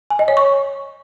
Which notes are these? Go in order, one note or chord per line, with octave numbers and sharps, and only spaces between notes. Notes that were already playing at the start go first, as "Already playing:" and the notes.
G#5
D#5
C#5
C#6